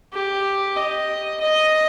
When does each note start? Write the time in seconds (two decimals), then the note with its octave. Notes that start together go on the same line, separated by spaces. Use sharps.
0.13 G4
0.77 D#5
1.41 D#5